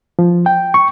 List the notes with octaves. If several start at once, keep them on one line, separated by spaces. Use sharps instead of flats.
F3
G5
C#6